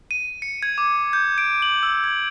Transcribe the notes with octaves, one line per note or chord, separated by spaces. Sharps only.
D#7
C#7
G#6
D6
G6
D7
F#7
E6
G#6